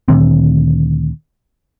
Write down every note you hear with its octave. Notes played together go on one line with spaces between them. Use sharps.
D2 A#2 D#3 C4